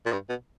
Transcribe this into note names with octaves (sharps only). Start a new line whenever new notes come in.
A#2
G2
B2